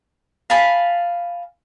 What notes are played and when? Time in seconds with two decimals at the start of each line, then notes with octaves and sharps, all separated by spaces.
0.50 F5 G#5 A5 B5